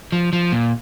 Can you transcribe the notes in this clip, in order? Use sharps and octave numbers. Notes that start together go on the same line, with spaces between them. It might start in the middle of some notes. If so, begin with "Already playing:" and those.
F3
F3
A#2